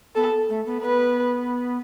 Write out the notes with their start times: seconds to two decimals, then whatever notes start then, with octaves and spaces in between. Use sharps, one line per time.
0.15 B3 A4
0.49 A3
0.66 B3
0.83 B3 B4